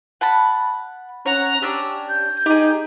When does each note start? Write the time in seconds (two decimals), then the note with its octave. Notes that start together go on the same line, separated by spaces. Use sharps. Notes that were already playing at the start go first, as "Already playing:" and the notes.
0.21 F#5 A5 B5
1.26 C#4 C#5 F#5 A#5
1.62 C#4 D4 G4 D5 E6
2.09 G6
2.46 D#4 G4 G#4